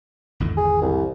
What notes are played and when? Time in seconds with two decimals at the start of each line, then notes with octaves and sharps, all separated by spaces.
0.40 G#1 E2 D3
0.57 G#4
0.82 C2